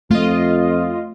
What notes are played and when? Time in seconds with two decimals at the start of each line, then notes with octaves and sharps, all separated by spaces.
0.11 F2 A3 F4 D#5